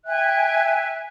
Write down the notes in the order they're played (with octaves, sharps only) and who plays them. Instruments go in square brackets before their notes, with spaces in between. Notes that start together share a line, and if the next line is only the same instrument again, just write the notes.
[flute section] E5 G5 G#5 F#6